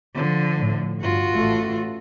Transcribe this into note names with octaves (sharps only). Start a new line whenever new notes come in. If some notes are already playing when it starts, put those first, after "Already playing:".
D3 F3
A2
G2 F4 F#4
A1 A3